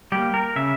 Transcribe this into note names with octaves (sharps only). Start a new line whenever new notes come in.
G3 A#3 G4
A#4
C#3 E5